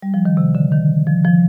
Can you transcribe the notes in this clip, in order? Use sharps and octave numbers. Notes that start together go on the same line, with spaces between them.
G3
F3
D#3
C3
D3
D#3
F3
F3